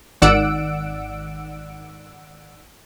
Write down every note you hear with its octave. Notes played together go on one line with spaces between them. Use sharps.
G#1 D#3 D5 F#5 E6 D7